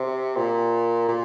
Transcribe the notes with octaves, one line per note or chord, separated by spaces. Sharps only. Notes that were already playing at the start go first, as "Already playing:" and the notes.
Already playing: C3
A#2
A#2